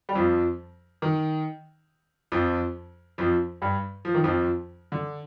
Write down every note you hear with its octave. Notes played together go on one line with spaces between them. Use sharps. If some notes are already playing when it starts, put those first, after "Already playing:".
G3
F2 F3
D#3
F2 F3
F2 F3
G2 G3
F3
D#3
F2 F3
D3